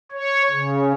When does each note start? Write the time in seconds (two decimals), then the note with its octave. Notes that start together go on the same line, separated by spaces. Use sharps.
0.12 C#5
0.50 C#3